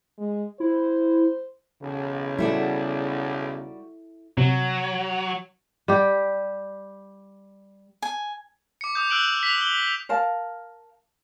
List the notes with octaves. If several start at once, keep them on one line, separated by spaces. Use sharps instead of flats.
G#3
E4 C5
B1 E2 C#3
G3 E4 F#4 A4 D5
C3 F#3
G3 G4
G#5
D6 C#7
D6 D#6 G6
E6 F#6 G6 D7 F#7
B6 F7
G7
A#4 F5 A5